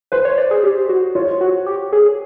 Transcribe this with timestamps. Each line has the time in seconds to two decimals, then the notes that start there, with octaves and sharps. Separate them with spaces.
0.12 B4 C5
0.25 C#5
0.38 D5
0.51 G#4
0.63 G4
0.89 F#4
1.15 F4 C#5
1.41 F#4
1.66 G4
1.92 G#4